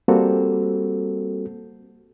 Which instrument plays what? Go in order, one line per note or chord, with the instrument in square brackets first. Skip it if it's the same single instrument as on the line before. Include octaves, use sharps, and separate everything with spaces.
[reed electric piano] G3 A#3 C4 F#4 A4